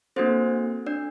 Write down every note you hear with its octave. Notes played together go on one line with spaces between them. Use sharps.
A#3 C4 D4 F#4 A4 C5
D4 D5